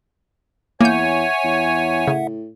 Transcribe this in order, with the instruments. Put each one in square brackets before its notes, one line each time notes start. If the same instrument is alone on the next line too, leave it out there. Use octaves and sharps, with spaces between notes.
[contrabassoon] E2 [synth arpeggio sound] A#3 G6 [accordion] C#5 G#5 [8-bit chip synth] E5 F#5
[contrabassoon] E2
[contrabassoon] A2 [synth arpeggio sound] C#3